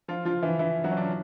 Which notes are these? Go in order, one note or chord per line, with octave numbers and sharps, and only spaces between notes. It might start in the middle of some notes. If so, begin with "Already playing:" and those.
F3 F4
F3 F4
E3 E4
E3 E4
F#3 F#4
C#4
D3 D4